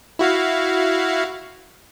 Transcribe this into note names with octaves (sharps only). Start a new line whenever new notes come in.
E4 F#4 F5